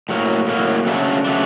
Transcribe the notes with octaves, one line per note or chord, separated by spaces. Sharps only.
A2 F#3 A#3
A2 F#3 A#3
C#3 F#3 A3 D4
C#3 F#3 A3 D4